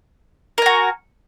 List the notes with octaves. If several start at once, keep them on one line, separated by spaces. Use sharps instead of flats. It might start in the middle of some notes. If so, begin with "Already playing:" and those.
F#4 A#4 G#5